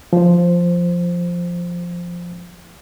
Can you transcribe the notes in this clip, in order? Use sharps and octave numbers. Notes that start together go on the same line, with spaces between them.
F3 C5